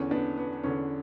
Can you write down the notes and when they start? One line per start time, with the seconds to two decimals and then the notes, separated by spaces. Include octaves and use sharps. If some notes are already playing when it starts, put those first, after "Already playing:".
Already playing: E2 D3 C#4
0.11 B3 D4
0.37 B3
0.64 E2 D3 C#4